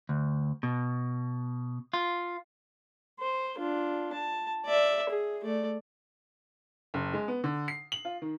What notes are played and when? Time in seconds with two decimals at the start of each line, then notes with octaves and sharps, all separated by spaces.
0.09 D2
0.63 B2
1.94 F4
3.20 C5
3.58 D4 F4
4.13 A5
4.66 D5 E5
5.09 G#4
5.44 A3 D5
6.94 F#1
7.14 G#3
7.28 B3
7.44 D3
7.68 C7
7.92 F#7
8.05 F4
8.22 D#3